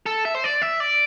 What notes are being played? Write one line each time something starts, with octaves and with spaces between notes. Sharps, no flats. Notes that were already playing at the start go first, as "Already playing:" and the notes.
A4
E5
C5
D5
E5
D5